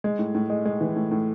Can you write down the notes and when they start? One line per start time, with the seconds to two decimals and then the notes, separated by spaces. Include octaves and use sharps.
0.04 G#3
0.19 A2
0.35 A2
0.50 G#3
0.65 G#3
0.81 E3
0.96 A2
1.11 A2